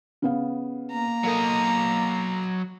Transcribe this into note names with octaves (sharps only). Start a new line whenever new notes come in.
C#3 B3 F5
A#3 A#5
F#3 A4 A#4 D#5 F5